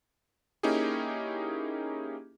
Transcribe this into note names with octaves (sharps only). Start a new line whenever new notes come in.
A#3 C#4 D#4 E4 G4 G#4